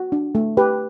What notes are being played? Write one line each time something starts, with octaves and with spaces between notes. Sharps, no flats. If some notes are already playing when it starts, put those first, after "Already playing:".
Already playing: F#4
D4
A3
G4 B4